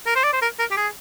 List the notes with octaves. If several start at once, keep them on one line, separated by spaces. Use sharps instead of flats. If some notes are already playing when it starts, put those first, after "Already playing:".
A#4
C5
D5
C5
A#4
A#4
G4
G#4